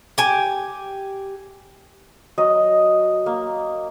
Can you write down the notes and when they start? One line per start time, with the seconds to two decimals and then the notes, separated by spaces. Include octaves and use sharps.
0.18 G4 G#5
2.38 F#3 D#5
3.26 A#3